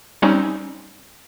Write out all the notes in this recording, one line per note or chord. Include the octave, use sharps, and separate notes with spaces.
G3 C4 C#4 D#4